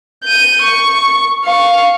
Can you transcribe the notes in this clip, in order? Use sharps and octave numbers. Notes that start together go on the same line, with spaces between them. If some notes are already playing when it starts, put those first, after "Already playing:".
G6 D#7
C#6
F5 C#6